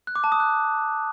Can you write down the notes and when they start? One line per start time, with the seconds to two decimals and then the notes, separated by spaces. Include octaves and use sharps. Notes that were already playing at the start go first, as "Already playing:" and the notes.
0.07 F#6
0.15 D6
0.24 A5
0.32 D#6
0.40 F#6